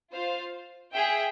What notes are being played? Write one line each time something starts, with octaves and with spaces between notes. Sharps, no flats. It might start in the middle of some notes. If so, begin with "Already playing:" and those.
F4 C5 F5
G#4 E5 G5